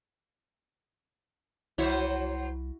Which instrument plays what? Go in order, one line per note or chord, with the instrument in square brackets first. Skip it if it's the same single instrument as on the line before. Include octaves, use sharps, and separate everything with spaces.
[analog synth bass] C2 [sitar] F#3 C5 C#5 [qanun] E4 F#4